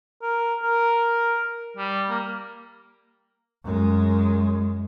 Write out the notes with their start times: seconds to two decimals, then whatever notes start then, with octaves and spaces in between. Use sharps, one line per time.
0.22 A#4
0.63 A#4
1.77 G3
2.10 A#3
3.64 F#2 G#3